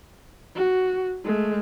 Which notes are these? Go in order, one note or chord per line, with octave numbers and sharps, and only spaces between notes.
F#4
G#3 A3